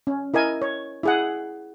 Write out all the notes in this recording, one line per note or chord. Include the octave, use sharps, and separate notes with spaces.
C#4
E4 A#4 D#5 G#5
C#5
E4 G#4 F#5